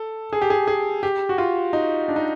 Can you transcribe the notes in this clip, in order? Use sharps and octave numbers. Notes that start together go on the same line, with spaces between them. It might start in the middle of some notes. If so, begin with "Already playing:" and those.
Already playing: A4
G#4
G4
G#4
G#4
G4
F#4
F4
D#4
D4
D#4